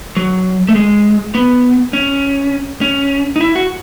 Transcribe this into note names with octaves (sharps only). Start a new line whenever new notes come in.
F#3
A3
G#3
B3
C#4
C#4
D#4
E4
F#4